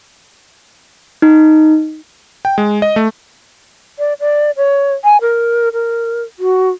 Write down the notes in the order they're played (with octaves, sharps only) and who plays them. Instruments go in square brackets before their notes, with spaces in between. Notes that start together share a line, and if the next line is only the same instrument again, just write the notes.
[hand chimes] D#4
[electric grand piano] G5
G#3
D#5
A3
[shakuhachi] D5
D5
C#5
G#5
A#4
A#4
F#4